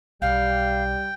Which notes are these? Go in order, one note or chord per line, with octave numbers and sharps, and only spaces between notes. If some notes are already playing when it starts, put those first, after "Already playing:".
B1 G3 F5 G5